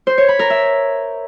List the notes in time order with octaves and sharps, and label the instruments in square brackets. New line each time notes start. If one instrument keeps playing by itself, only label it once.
[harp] C5
C#5
B5
A#4
E5